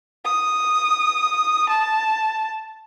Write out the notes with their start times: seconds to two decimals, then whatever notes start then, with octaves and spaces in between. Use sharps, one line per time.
0.25 D#6
1.70 A5